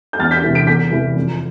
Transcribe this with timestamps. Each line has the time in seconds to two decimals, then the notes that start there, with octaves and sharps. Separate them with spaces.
0.13 G6
0.19 E2 F6 A6
0.31 G6 B6
0.44 C3 E3
0.55 B6 D7
0.67 E2 G6 B6
0.91 C3 E3
1.15 F2